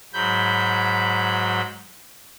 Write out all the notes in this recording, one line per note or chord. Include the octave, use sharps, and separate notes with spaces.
G#2 F#3 B5 G6